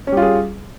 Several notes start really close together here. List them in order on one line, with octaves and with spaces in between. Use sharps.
C#4 G3 F4 G#4